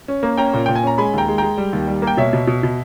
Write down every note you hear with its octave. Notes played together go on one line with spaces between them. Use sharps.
C#4
A#3
C#4 G5 A#5
A#2
A#2 G5
G#5
C#4 A#5
G#3 G#5 B5
D#2 G5 A#5
G#3
G#3 G5 A#5
G3
D#2
G3
A#3
G5
B2 C#5 E5
B2
B2
B2